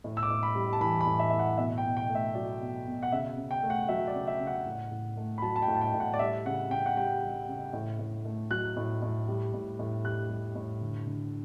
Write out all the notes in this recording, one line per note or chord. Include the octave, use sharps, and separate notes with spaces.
A2
E6
D6
A2
B5
G3
A5
E3 B5
B5
A2
E5
A2 E5
F#5
B2 E5
G5
B2
G5
A3
E5
F#3 D5
B2
B2
F#5
C#3 E5
C#3
G5
A3
F#5
F#3 E5
D5
C#3
E5
C#3
F#5
A2
A2
A3
B5
F#3 A5
A5
G5
A2
A5
G5
A2
F#5
D5
G3 E5
C#3 F#5
C#3 G5
F#5
G3 G5
G3
C#3
A2
A2
A3
F#3 F#6
A2
A2
G3
A2
A2
G3 F#6
G3
A2
D3
D3